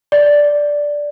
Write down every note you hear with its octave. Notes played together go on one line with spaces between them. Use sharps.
D5